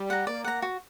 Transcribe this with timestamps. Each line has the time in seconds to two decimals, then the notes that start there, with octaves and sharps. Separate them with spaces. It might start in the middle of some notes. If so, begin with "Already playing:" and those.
Already playing: G3
0.10 F#5 A#5
0.27 A#3 D5
0.44 F#5 A#5
0.62 F#4